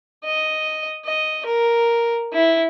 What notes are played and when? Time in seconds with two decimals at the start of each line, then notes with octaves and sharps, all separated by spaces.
0.24 D#5
1.05 D#5
1.46 A#4
2.33 E4